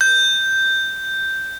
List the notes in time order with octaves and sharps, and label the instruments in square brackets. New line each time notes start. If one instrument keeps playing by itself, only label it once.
[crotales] G6